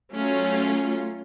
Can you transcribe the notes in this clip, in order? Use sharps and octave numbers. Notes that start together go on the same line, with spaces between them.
F#3 A3 C#4 F4